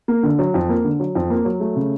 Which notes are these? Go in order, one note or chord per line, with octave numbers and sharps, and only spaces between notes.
A#3
D3
F#3
F2
A#3
D3
F#3
F2
A#3
F#3
A3
C#3